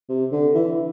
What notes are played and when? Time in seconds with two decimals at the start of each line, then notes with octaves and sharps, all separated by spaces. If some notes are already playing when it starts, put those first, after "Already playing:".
0.09 C3
0.32 D3
0.55 E3